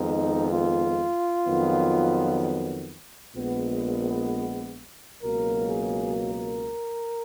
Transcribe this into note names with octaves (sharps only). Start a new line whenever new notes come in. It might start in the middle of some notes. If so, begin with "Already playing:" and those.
Already playing: F2 D#3 G#3 B3 D#4
F4
F2 D#3 F#3 B3
A#1 A#2 G#3 B3
C#2 B2 F#3 A#3 A#4
G#4
A#4